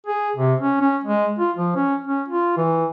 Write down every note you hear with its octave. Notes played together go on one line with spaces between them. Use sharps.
G#4
C3
C#4
C#4
G#3
F4
F3
C#4
C#4
F4
E3